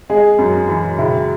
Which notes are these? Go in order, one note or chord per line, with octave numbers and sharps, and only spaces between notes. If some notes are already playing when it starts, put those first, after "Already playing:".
G#3 G#4
F#2
E3
C#2 E4